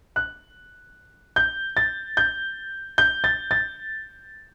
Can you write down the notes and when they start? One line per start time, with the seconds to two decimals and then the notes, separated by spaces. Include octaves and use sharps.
0.16 F#6
1.36 G6
1.77 A6
2.17 G6
2.98 G6
3.24 A6
3.51 A6